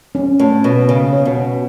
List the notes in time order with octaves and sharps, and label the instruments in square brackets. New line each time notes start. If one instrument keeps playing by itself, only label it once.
[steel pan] C#4
[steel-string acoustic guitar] A2 [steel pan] C#5
[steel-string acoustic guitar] B2 [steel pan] C#5
[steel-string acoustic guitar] C#3 [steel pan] C#5
[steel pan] C#5
[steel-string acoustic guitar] B2
[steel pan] C#4